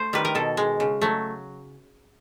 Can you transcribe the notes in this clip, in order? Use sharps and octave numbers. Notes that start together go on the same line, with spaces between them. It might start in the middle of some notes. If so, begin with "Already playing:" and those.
Already playing: A3 C5
D#3 G3 B4
A#4
B2 A4
G#3
C#3
F#3 A3